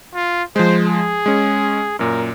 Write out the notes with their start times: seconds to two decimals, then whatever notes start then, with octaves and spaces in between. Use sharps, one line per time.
0.15 F4
0.56 F3 G#3 C5
0.87 G#4
1.26 G#3 C#4
1.99 F#2 A#2 A#4